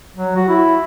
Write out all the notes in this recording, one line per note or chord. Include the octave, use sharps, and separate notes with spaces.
F#3
F#4
E4